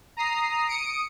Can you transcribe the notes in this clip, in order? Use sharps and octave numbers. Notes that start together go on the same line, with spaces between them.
A#5 D#6 C7
D#6 C#7 D7